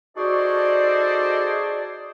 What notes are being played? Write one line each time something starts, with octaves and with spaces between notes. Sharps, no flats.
D#4 F#4 G#4 A4 C5 D5